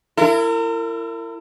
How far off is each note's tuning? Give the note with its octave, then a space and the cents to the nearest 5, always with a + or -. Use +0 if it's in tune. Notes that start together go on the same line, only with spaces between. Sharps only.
E4 +30 A#4 -35